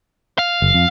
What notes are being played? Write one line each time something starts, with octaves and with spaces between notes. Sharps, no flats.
F5
F#1
F2